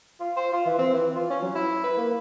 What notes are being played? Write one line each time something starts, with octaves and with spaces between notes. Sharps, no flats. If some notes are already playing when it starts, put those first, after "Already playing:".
F4
C5
F4
E3
C4
E3
F4
C#4
F#3
E4
B4
A#3